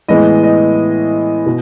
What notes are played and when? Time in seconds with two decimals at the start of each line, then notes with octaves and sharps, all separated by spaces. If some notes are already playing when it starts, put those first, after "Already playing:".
0.08 A2 E3 G#3 B3 D#5
0.43 D#5
1.46 B2